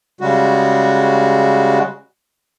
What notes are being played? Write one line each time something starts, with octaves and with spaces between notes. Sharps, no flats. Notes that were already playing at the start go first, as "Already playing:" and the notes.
C#3 G3 G#3 F#4